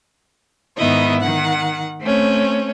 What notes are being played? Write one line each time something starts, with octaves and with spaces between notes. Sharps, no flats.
G#2 D#3 B3 E4 D#5
D#3 F#5
A3 C4 C#4